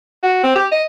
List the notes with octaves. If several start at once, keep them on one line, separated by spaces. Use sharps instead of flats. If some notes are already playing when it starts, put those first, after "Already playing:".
F#4
C4
G4
D#5